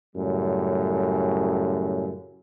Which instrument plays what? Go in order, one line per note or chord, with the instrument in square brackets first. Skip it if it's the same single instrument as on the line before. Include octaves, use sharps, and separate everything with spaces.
[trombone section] F#2 A2 C#3 G3